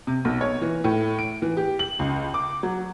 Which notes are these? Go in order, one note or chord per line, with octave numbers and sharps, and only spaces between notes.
C3
B1
C#5
E3
A2
D7
E3
G4
F#7
C#2
D6
F#3